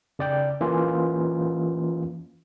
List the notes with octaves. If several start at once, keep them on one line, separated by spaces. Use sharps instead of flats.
C#3 D5 G5
E3 A#3 C#4 F4